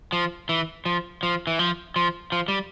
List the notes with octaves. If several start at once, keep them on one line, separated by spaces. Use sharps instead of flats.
F3
E3
F3
F3
E3
F3
F3
F3
G3